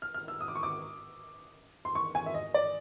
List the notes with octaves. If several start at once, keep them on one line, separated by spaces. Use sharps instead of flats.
F6
F6
E6
D#6
D6
C#6
D6
C6
C#6
G#5
E5
D#5
D5